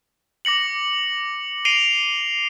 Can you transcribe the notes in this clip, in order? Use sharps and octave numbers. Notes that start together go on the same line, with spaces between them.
D6 A#6 C#7 F#7
C7 D7 D#7 F7 G7